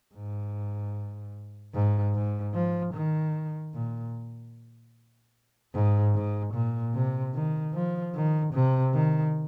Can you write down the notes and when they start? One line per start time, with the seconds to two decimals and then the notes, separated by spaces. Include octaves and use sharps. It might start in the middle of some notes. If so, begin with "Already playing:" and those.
0.14 G#2
1.74 G#2
2.14 G#2
2.54 F3
2.94 D#3
3.74 A#2
5.74 G#2
6.14 G#2
6.54 A#2
6.94 C3
7.34 D#3
7.74 F3
8.14 D#3
8.54 C3
8.94 D#3